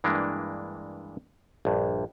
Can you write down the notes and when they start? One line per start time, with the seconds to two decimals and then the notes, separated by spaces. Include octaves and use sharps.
0.04 G2 E3 G#3 A#3 D4
1.65 A#1 G2